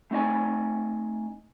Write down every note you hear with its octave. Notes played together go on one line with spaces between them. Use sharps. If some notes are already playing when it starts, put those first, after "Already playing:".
A3 C4 D#4 D#5 G#5